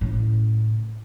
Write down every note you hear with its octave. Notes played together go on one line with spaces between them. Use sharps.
A2 C#3